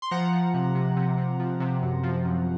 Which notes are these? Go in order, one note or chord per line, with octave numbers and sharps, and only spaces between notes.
C6
F3 F#5 A#5
F3
C3
C3
C3
C3
F3
C3
F#2
F3
F#2